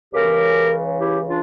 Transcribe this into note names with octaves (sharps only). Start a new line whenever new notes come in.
C#2 C#3 E3 G4 A#4
E4 G4
D4 F4